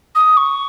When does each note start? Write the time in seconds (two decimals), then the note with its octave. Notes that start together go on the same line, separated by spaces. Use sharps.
0.15 D#6
0.37 C#6